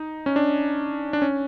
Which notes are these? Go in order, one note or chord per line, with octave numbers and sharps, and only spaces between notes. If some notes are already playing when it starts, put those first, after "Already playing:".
Already playing: D#4
C#4
D4
D4
C#4